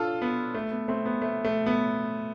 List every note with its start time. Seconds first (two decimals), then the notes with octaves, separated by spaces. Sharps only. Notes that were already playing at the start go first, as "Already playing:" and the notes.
Already playing: D4 F4 A4
0.22 B3
0.55 A3
0.71 B3
0.88 A3 C4
1.06 B3
1.22 A3
1.44 A3
1.66 B3